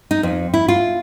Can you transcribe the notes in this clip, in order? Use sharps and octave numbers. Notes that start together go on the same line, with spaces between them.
D#4
F2
E4
F4